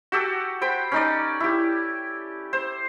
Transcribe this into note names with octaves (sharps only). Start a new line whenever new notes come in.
F#4 G4 A4
C5 G5 B5
C#4 D#4 D5
E4 G4
C5